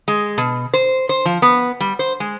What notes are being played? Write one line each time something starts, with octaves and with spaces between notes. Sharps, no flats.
G#3
B2
C5
C5
F3
B3
G3
C5
G#3